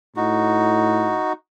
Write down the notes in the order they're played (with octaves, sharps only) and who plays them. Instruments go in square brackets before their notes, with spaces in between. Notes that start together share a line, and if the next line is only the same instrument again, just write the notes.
[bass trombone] A2 [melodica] D#4 F#4